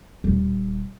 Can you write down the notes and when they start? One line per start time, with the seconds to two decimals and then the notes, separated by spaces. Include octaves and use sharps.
0.24 D#1